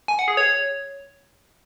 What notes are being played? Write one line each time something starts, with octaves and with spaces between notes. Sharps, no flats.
G#5
F#5
G#4
C#5